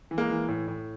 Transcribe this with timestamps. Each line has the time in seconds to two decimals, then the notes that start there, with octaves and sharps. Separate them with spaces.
0.11 E3
0.18 G#3 A#3
0.30 E3
0.48 A2
0.68 A2